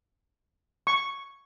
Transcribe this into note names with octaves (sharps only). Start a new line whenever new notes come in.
C#6